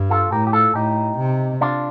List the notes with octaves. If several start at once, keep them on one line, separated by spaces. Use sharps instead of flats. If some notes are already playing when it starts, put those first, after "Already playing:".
Already playing: G2
F4 A4
A2 G4 A#4
G4
F4 A4
A2 D#4 G4
C3
D4 F4